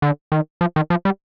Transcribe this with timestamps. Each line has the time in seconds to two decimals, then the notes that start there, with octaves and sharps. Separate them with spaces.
0.02 D3
0.32 D#3
0.61 F3
0.76 D#3
0.90 F3
1.05 G3